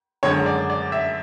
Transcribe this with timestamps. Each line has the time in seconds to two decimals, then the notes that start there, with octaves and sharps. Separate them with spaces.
0.23 F#2 D3 G#3 C#5
0.46 D5
0.70 D5
0.92 E5